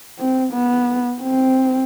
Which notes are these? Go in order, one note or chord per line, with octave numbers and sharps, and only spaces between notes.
C4
B3
C4